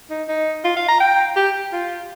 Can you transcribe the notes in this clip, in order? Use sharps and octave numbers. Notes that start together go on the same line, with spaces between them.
D#4
D#4
F4
F5
A#5
G5
G4
F4